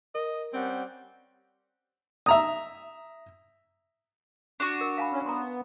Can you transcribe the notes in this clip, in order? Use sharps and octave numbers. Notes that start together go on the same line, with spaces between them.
A#4 D#5
G3 C4 C#4 F#5
E5 A#5 D#6
D4 F#4
A#4
F5 G#5 B5
C#4
B3 A#5 C6